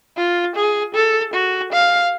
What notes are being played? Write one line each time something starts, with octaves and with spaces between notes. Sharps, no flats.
F4
G#4
A4
F#4
F5